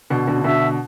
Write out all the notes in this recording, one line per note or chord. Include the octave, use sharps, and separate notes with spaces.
B2 D3
B2 D3
C#3
B2 D3 E5